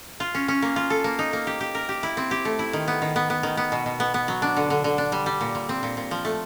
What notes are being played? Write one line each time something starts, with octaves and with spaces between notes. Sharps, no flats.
F4
C#4
C#4
A#3
F4
A4
A#3
D#4
A#3
G4
G4
A#4
G4
E4
C4
G4
A3
E4
D#3
B3
D#3
B3
B3
D#3
B3
B2
B2
B3
B3
F#3
D4
D3
D3
D3
D4
G3
G3
A#2
A#2
C4
A#2
A#2
F3
A3